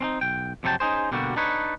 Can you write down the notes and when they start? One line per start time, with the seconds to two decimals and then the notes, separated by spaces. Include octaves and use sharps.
0.01 C4 C#4 D#4
0.21 B1 G5
0.63 F2 C3 F#3 A4 G5 A5
0.80 C#4 D#4 G#4 C5
1.11 B2 D3 G3 A#3 F#4
1.36 D4 D#4 B4 C#5